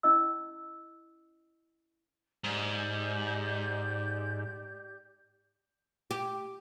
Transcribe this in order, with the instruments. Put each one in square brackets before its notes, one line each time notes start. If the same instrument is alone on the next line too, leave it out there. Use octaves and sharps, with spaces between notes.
[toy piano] C#4 E4 D#5 E6
[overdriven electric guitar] G#2 [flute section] G4 D5 G6
[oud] G4